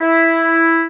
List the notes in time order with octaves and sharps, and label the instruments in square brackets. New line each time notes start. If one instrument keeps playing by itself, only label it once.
[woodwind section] E4